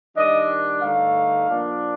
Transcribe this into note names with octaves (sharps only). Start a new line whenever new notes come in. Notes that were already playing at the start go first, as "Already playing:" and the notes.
D#3 G3 D4 D#5
G2 D3 A3 D#4 F5
A#2 F3 A#3 D4